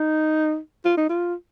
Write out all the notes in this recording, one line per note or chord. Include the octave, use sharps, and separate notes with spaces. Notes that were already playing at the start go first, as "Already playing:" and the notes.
Already playing: D#4
F4
D#4
F4